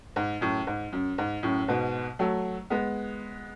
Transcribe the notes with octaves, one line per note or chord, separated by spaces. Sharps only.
G#2
F#2 A2
G#2
F#2
G#2
F#2 A2
G#2 B2
F#3 A3
G#3 B3